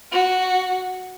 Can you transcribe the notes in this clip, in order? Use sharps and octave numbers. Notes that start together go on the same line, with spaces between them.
F#4